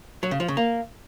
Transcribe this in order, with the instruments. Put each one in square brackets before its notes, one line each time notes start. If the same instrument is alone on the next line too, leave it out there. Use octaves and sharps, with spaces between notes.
[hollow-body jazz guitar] F#3
C#3
F3
C#3
A#3